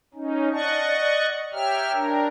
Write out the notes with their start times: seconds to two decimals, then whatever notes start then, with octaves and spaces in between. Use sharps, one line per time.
0.14 C#4 D#4
0.52 D5 D#5 F5 F#5 A5 C#6
0.82 D5
1.53 G4 C#5 E5 G5 A#5 F6
1.93 D4 A#4